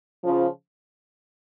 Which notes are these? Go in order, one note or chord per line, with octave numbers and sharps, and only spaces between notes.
C#3 F3